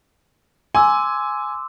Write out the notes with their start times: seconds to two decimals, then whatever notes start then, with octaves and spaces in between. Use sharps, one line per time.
0.75 G#5 C6 D6 E6